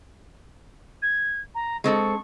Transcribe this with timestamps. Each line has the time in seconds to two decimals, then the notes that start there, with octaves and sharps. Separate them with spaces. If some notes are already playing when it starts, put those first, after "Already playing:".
1.02 G#6
1.55 A#5
1.84 G#3 C4 A4 C#6